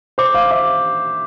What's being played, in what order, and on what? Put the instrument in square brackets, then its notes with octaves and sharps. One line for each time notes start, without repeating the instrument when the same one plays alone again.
[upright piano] C5 [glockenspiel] D6
[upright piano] F5 [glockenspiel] D6
[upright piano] E5 [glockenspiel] D6